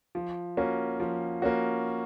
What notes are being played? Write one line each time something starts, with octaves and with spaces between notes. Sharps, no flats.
F3
A#3 C#4 F#4
F3
A#3 C#4 F#4